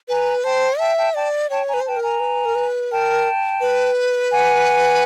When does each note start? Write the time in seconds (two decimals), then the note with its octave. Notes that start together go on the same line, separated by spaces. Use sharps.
0.08 B4 G#5 A#5
0.44 C5 G5 A5
0.79 E5 G5 A5
0.96 G5 A5
1.14 D5 G5 A5
1.50 C#5 G5 A5
1.67 G#5 A#5
1.74 B4
1.80 C5
1.86 B4 G5 A5
1.96 A#4
2.03 G#5 A#5
2.20 B4
2.45 A#4
2.55 B4
2.91 A#4 G5 A5
3.61 B4
4.31 F#5 G#5